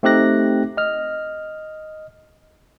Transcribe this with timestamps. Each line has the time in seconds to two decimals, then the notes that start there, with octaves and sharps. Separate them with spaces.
0.03 A3 C4 D#4 G4 F#6 A#6
0.77 D#5 F6